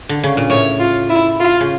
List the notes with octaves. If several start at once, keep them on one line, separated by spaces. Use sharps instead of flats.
D3
C#3
A#2
A2 C#5
F4
E4
F4
C#3